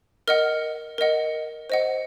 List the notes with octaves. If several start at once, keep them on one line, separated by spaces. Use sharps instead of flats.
A#4 D#5 F#5 F6
A#4 D#5 F#5
C5 D#5 F#5